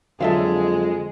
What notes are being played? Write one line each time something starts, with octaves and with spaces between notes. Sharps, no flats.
F2 D3 F#3 G#3 F4 A4 E5 F5